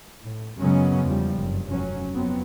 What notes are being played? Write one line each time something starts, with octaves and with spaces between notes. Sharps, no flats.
A2
F#2 C#3 F#3 G#3 B3 C#4
E2 F3 G3
F#1 G2
F1 F#3 C#4
F2 F#3 B3 C4